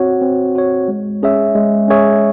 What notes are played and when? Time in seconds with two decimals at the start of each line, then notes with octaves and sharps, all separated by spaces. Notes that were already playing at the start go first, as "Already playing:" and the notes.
Already playing: C4 F#4 C#5
0.21 C4
0.55 F#4 C#5
0.88 G#3
1.23 C#4 G#4 C#5 E5
1.55 G#3
1.88 C#4 G#4 C#5 E5